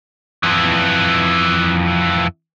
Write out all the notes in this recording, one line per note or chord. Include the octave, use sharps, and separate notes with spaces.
F2 E3